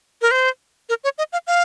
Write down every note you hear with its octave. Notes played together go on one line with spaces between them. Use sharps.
A#4
C5
A#4
C#5
D#5
F5
F5